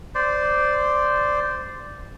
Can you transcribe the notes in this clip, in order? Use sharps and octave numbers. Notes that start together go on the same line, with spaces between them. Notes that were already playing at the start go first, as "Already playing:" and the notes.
C5 D5